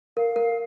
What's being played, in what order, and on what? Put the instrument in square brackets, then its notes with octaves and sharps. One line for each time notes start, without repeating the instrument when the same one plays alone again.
[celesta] A#4 [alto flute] F5
[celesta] A#4